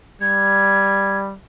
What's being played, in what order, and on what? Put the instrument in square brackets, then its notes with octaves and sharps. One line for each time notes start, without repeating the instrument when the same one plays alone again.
[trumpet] G3 [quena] G#6